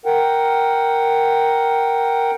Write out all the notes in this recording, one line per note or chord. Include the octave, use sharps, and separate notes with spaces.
A#4 F#5 G5